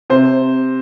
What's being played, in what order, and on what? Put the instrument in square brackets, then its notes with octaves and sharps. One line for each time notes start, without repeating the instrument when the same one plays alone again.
[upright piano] C3 C5